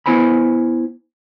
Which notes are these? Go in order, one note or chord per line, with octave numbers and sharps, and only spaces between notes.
B3 E4 C5 G#5 B5